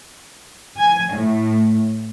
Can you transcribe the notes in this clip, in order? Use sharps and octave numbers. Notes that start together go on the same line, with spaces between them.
G#5
A2